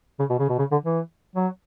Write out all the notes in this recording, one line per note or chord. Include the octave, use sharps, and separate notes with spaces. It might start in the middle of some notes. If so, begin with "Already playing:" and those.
C#3
B2
C#3
B2
C#3
D3
E3
F#3